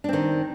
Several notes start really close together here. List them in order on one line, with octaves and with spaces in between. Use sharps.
D4 C4 D#3